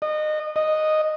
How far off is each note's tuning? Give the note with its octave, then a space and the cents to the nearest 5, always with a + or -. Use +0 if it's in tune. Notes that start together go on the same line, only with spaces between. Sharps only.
D#5 -25
D#5 -5